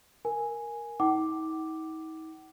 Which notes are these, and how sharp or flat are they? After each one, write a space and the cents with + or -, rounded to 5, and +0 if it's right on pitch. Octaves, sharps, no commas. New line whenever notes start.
A#4 +0 G#5 +0
D#4 +45 F#5 +40 D6 +0